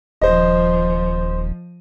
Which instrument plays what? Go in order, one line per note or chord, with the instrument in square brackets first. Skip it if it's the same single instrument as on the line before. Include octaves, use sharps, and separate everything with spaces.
[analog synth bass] D#1 [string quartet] F3 [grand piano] C5 D#5